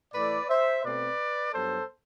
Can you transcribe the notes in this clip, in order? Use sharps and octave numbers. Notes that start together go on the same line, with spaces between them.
A2 E3 A3 B4 D5
C5 E5
B2 A3 C4 B4 D5
G2 F#3 B3 A4 C5